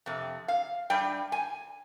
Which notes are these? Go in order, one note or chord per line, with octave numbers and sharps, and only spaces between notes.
F2 C3
F5
G2 G3 G5
G#5